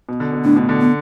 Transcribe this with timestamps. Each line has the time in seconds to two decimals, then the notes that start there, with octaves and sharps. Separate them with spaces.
0.09 B2
0.20 D3
0.33 B2
0.44 A2 D4
0.56 B2
0.69 D3
0.81 B3